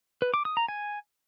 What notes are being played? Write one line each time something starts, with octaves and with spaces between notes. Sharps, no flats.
B4
D6
D#6
A#5
G#5